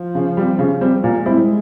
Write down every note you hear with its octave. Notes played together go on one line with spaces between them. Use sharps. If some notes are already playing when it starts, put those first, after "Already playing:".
Already playing: F3
C#3
G3 C4
C#3
G3 C4
A#2 G#3
G3 C4 E4